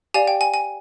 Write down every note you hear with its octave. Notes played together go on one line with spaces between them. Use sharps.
G4 D5 F5 G#5
G5
G#5
G#5